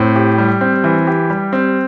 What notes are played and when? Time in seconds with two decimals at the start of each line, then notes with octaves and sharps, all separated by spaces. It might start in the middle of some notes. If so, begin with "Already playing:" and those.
Already playing: A2 C4
0.16 G4
0.38 G3
0.61 C4
0.84 E3
1.07 G4
1.30 G3
1.53 C4